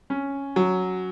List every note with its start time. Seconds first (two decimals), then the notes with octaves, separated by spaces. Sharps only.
0.10 C#4
0.56 F#3